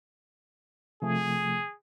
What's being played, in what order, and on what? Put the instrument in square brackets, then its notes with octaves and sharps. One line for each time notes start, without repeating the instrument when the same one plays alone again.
[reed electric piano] C3 F3 A3 [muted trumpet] G#4